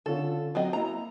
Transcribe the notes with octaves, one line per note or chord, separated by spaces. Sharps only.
D3 C#4 F4 A4
F#3 C4 F#4 D#5
A#3 E4 A#5